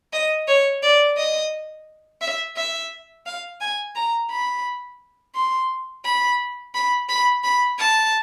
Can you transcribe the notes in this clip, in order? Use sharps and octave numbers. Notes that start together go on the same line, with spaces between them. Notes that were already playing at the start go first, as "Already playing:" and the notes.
D#5
C#5
D5
D#5
E5
E5
F5
G#5
A#5
B5
C6
B5
B5
B5
B5
A5